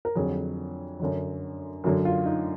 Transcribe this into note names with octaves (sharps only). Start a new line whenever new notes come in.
A#4
F2 D3 F#3 G#4
F#2 D3 F#3
F#2 D3 F#3 F#4
F4
D#4